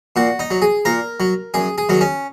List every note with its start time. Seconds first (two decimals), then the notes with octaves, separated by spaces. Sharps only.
0.16 A#2 F#4
0.39 D#4
0.51 F#3
0.62 G#4
0.85 A#2 A#4
1.20 F#3
1.54 F#2 G#4
1.78 G#4
1.89 D#3 F#3
2.01 C#4